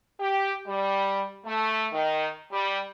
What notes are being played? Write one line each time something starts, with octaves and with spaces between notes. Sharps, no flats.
G4
G3
A3
D#3
G3